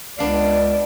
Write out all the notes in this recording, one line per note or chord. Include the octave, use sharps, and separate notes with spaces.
C#2 B3 D4 D5 F5